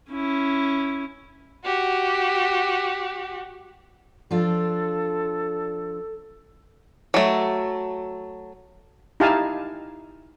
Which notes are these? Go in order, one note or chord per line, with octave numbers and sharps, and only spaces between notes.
C#4 E4
F#4 G4
F3 D4 F4 A4
F#3 A3
D#4 E4 G4 F5 G#5 A5